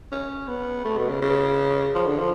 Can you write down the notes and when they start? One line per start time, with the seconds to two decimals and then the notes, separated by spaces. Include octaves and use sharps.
0.12 C#4
0.48 B3
0.85 A3
0.98 B2
1.09 C#3
1.22 C#3
1.95 F3
2.06 D3
2.19 F3